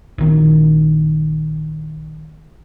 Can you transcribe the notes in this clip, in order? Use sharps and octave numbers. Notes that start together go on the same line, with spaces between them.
A#1 D#3